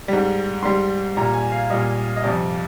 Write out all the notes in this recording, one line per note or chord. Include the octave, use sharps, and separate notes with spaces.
G#2 G3
G#2 G3 C6
A#2 G3 A#5
G#5
F5
A#2 G3 D#5
D#5
F2 C3 G3 D5